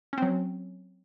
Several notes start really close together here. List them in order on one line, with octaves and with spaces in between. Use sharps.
C#4 C4 F#3